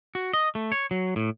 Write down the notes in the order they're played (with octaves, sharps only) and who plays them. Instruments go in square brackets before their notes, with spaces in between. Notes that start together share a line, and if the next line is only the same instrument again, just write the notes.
[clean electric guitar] F#4
D#5
A3
C#5
F#3
A2